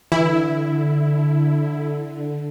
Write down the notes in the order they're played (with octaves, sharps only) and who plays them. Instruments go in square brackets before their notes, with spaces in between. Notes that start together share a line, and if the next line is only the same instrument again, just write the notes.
[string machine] D3 [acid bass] E3 [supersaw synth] E4